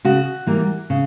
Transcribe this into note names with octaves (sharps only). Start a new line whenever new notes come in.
C#3 F#4
E3 G3 A#3
C#3